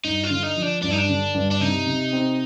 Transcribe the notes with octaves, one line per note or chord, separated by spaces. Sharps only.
G2 D#4
F4
D3
D#4
F3
D4
G2 D4
D#4
D4
D3
G2
D4
C3 D#4
C3
C4